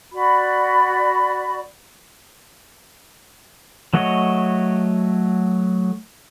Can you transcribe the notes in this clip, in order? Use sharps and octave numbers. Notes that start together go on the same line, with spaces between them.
F#4 D5 B5
F#3 A3 F#4 C#5 D#5